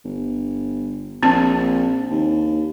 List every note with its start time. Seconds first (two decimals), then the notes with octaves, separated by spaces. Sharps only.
0.05 G1
1.23 A#1 C4 A5
2.11 D#2